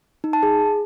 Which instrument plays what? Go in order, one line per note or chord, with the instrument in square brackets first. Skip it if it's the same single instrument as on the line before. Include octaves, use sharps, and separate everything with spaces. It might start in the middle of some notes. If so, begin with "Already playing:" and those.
[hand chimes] D#4
A5
G#4